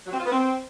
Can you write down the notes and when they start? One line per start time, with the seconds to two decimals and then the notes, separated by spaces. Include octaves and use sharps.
0.06 F#3
0.13 C4
0.19 F4
0.26 B3
0.32 C4